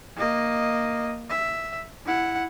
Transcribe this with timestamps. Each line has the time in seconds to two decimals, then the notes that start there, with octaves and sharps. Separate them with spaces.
0.16 A#3 D#5
1.30 E5
2.05 E4 F#5